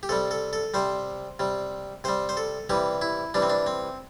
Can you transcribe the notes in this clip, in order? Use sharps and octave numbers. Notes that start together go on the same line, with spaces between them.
G4
C3 G3 A4
A4
A4
C3 G3 C5
C3 G3
C3 G3 C5
C5
A4
C3 E3 G3 G4
E4
C3 E3 G3 D4
C4
D4
C4